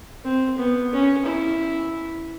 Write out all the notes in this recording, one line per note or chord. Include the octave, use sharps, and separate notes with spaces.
C4
B3
C#4
E4